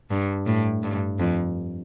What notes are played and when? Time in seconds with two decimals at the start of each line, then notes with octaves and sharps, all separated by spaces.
0.11 G2
0.46 A2
0.83 G2
1.20 F2